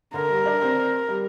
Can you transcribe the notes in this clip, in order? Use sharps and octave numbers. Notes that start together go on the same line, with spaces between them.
D3 A#4
G3
D4
C4
G3